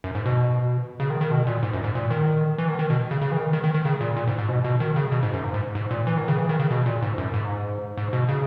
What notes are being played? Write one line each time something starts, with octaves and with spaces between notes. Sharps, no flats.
F#2
G#2
B2
C#3
D#3
D#3
B2
A#2
G#2
F#2
G#2
A#2
D#3
E3
D#3
D#3
B2
C#3
C#3
E3
D#3
D#3
D#3
D#3
C#3
A#2
A#2
G#2
G#2
B2
B2
D#3
C#3
B2
G#2
F#2
G#2
G#2
G#2
A#2
E3
D#3
C#3
E3
D#3
C#3
B2
A#2
G#2
F#2
G#2
G#2
B2
C#3